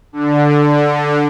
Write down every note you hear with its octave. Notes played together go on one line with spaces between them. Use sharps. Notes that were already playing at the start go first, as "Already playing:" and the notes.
D3